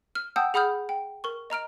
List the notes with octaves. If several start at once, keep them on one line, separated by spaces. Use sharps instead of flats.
F6
F#5 G5 A5 D#6 E6 G6
G#4 F#5 B5 D#6 F6 G6
G5
A#4 C#6
D#5 A#5 F6 D7